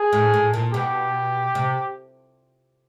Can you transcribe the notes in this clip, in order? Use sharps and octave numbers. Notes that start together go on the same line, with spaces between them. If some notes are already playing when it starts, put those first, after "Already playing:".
Already playing: G#4
A2
A2
A#2
B2 G4
C3